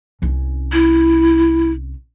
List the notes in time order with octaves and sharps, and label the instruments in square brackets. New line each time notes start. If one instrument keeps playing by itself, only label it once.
[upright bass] C2 C#4
[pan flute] E4